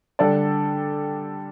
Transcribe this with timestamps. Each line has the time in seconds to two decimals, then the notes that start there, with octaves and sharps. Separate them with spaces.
0.19 D3 G3 D4 A4 D5